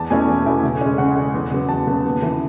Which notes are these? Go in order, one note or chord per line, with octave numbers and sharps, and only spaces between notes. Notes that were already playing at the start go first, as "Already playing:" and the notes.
Already playing: E2 A5
B2 A3 C#4 E4 G#5
E2
B2 A3 C#4 E4
C#3
G#3 C#4
C#3 F#5
G#3 C#4
E2
C#3 F#3 B3
E2 A5
C#3 F#3 B3
D#2
C#3 E3